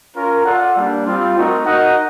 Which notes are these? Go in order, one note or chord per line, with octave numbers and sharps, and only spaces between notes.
C#4 F4 A#4
F4 A4 D5 F#5
G3 A#3 D4
G3 C4 F4
A3 C4 D#4 F#4 A#4
D#4 F#4 A#4 D#5 F#5